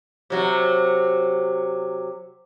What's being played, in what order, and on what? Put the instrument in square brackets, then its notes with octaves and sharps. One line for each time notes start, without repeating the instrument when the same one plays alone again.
[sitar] C3 F#3